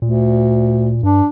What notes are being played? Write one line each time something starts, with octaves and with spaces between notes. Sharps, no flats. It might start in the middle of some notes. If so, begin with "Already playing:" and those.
D2 A#2
G2 D4